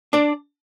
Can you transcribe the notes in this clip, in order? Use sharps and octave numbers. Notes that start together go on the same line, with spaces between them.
D4 D5